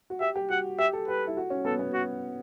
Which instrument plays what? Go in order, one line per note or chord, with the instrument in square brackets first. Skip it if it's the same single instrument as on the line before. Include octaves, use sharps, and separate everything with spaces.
[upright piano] F#4
[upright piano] G4 [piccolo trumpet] E5
[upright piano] G4
[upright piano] F#4 [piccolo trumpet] F#5
[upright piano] G4 [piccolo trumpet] E5
[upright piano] A4
[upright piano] G4 [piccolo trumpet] B4
[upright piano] E4
F#4
C#4
[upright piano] B3 [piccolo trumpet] A4
[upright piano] B3
[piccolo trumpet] F#4